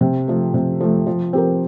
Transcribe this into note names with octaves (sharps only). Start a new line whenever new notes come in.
C3
F3 A3
C3
F3 A3
F3
C4 G4 A#4